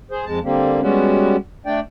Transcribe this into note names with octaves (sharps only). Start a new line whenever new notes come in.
G#4 C5
F2 G#3 A5
D3 G3 A#3 C4
G3 G#3 B3 C#4 F#4
A3 D4 D5 G5